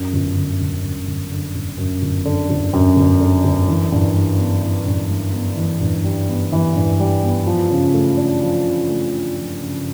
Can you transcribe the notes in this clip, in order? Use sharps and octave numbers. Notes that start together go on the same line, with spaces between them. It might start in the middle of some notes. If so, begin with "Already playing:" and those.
Already playing: F#2
G1
D3
G1
F#2
G1
D3
G1
F#2
G1
D3
G1
F#2
G1
D3
G1
E3
G2
G3
B3
E3
G2
G3
B3
E3
G2
G3
B3
E3
G2
G3
B3
F3
C#3
A3
D4
F3
C#3
A3
D4
F3
C#3